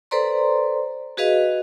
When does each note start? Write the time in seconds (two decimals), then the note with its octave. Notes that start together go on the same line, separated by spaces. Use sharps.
0.11 A4 B4 C5 D5 A#5 C6
1.17 F#4 G#4 B4 D#5 F5